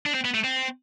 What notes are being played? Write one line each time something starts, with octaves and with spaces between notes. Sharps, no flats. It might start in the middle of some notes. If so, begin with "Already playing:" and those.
D4
C4
B3
A3
C4